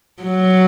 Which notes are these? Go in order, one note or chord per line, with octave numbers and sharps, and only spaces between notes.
F#3